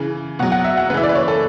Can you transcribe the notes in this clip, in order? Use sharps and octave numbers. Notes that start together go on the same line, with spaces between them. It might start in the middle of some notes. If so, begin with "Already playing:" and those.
Already playing: C#3 E3
B2 F#3 F#5
F#5
E5
F#5
C#3 E3 B4 E5
D5
B4
C#5
A4